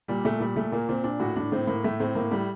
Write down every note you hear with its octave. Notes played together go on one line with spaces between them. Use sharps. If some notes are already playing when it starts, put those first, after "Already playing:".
A#2 G3
A#2 A3
A#2 G3
A#2 A3
A#2 A#3
A#2 C4
A#2 D4
A2 F#4
A2 D4
A2 C4
A2 A#3
A2 A3
A2 C4
A2 A#3
A2 G3